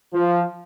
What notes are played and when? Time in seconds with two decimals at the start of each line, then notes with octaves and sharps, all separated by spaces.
0.14 F3